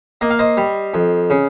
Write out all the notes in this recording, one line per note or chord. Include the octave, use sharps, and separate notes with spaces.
A#3 D#5
F5
C5 D#5
G3
F2
C#3